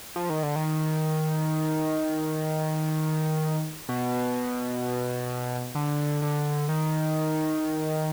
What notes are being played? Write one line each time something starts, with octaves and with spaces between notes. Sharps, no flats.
F3
D#3
D3
D#3
B2
D3
D3
D#3